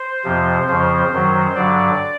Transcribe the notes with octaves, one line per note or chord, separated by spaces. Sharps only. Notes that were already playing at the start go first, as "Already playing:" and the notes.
Already playing: C5
F2 C3 F3
F2 C#3 F3 C5
F#2 D#3 F#3
G2 D3 F#3 D5